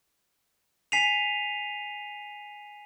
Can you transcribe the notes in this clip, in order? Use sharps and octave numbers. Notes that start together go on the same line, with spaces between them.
G#5 B6 C7 D#7 F7